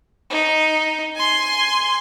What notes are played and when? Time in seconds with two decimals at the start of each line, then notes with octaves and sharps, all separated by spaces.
0.30 D#4
1.15 G#5 C6